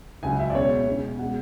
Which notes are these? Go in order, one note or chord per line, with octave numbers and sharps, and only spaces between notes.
C#2 C#3 F#3 G#5
E5
D5
B2 G#3 C#4 C#5
B2 G#3 C#4
B2 G#3 F#5